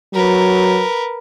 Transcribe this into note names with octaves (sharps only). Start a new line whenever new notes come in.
F#3 A#4 B4